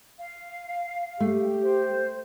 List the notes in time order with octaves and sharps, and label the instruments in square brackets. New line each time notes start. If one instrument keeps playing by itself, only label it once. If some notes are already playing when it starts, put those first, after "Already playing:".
[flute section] F5
[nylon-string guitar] A3 [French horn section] G4
[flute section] C5